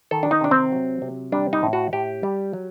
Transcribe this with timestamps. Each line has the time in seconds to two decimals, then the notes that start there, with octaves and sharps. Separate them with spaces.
0.11 D#3 A4
0.23 D4
0.31 D#4
0.41 C3 D4
0.51 C4
0.72 F#3
1.02 C3
1.32 G3 D4
1.53 D#4
1.63 A2
1.73 F#4
1.93 A2 G4
2.23 G3
2.53 F#3